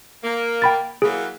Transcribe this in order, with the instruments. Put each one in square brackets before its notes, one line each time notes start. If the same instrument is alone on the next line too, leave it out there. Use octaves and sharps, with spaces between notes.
[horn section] A#3
[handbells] G5 B5 A6
[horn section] E3 F#3 A#3 [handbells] G#4